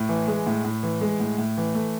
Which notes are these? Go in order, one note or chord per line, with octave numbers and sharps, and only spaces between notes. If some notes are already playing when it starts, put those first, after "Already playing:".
Already playing: A2
E3
G#3
A2
A2
E3
G#3
A2
A2
E3
A3